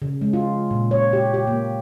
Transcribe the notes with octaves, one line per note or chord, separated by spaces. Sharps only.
C#3
G#3
F4
A#2
C#5
G4
G4
A#3